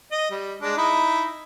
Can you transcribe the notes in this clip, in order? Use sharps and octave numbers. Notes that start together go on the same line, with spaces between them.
D#5
G3
G#3 D4
D#4 E4